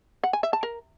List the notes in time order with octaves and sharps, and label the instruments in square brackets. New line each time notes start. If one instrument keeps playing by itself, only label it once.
[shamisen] F#5
G#5
E5
A5
A#4